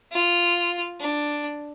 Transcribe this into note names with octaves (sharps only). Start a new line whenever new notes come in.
F4
D4